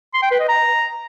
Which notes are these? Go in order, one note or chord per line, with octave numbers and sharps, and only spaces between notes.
C6
G5
B4
D#5
A#5